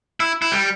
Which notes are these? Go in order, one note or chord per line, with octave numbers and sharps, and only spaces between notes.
E4
E4
G3